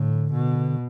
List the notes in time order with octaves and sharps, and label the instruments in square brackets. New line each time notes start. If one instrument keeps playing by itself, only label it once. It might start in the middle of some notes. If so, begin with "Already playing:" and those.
Already playing: [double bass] A2 [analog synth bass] D3
[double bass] B2